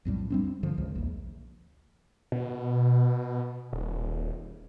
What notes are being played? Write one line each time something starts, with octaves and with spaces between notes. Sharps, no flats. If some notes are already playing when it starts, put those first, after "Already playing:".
B1 F2 A2 G3
G3 C4 D4
G2 D3 F3
C#2
A#1 D#2
B2
D#1